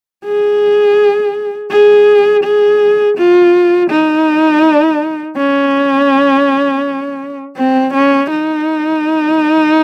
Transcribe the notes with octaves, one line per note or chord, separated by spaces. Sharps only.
G#4
G#4
G#4
F4
D#4
C#4
C4
C#4
D#4